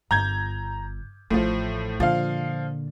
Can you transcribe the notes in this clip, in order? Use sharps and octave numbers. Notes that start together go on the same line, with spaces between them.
G1 A#5 G6 G#6
A1 A2 E3 F3
A#2 D3 F3 F5